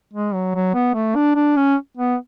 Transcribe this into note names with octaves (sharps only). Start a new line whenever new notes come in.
G#3
F#3
F#3
B3
A3
D4
D4
C#4
B3